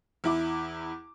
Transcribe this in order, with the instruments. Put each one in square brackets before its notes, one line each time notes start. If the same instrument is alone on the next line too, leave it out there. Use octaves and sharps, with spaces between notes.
[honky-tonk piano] E2 E4 D6